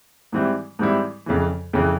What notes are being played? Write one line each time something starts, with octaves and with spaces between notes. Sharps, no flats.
G#2 E3 G3 C4 E4
G#2 E3 G3 C4 E4
F2 C#3 E3
F2 C#3 E3